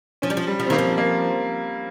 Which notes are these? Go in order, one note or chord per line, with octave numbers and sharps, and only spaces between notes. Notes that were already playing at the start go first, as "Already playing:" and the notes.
F3 C#4
G3
F3
G3
F3
C4
D#3 A#3
F3
A#3